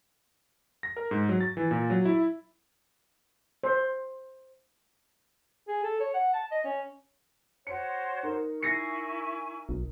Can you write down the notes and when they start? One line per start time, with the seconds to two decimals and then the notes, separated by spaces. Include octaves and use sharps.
0.83 A#6
0.97 A#4
1.11 G#2
1.29 F#3
1.41 A6
1.57 E3
1.71 A#2
1.90 F#3
2.05 E4
3.64 C5
5.68 G#4
5.84 A4
6.00 C#5
6.14 F#5
6.34 A5
6.51 D#5
6.65 C#4
7.67 F#4 C5 C#5 C#7
8.23 D#4 A#4
8.62 E4 G#5 C#6 A#6 C7 C#7
9.69 B1